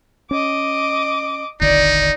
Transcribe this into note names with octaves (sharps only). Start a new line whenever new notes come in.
C#4 D#5 D6
D#1 G#1 D3 D#4 D5